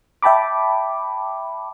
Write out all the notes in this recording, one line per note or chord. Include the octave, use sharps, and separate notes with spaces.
E5 G5 A5 B5 D6